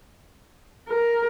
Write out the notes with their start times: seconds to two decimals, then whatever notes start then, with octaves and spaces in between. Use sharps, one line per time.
0.89 A#4